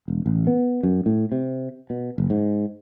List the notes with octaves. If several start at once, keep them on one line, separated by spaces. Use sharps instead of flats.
E1
A1
B3
F#2
A2
C3
B2
F#1
G#2